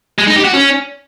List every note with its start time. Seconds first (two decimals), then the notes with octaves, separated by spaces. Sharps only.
0.18 G#3
0.27 D#4
0.36 G4
0.45 F#4
0.53 C#4